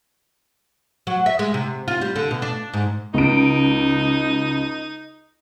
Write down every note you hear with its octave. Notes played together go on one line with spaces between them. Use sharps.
F#3
E5
G#3
C3
F4
G3
D3
B2
D4
G#2
C#2 D#4 D7